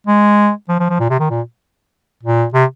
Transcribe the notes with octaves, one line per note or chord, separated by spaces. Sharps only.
G#3
F3
F3
F3
A#2
C3
D#3
A#2
A#2
C3